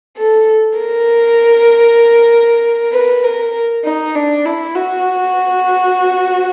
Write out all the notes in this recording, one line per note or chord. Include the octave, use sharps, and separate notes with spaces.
A4
A#4
B4
A#4
D#4
D4
E4
F#4